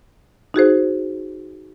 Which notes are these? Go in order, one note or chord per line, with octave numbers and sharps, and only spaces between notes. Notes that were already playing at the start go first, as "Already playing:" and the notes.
D#4 F#4 G#4 C5